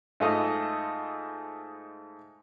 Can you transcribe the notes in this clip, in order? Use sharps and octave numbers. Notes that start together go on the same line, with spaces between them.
G#2 A3 F4 A4 D#5 F6